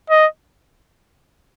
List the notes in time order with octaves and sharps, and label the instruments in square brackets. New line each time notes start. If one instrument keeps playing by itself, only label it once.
[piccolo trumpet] D#5